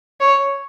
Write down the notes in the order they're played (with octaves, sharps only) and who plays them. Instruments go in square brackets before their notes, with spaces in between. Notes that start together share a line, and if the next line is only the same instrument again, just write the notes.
[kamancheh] C#5